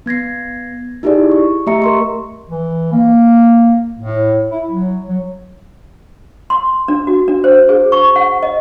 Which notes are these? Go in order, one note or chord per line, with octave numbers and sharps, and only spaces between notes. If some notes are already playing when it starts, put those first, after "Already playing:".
B3 G#6 A#6 C7
D#4 E4 G4 G#4 D5
C#6
A3 G4 D#5 E5 A#5 C#7
A#4 C6 C#6
E3
A#3
A2
E4
F#3
F#3
C6
D4
F#4
D4
C5
G#4
C#6
F#5
D#5